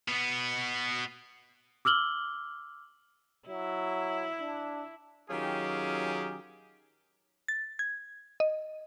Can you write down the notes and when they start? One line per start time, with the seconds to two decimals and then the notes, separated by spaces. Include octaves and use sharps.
0.08 B2 B3
1.85 D6 E6 F6 F#7 G7
3.48 F#3 E4
4.40 D4
5.30 D#3 F#3 C#4 F4 G4 G#4
7.48 A6
7.79 G#6
8.40 D#5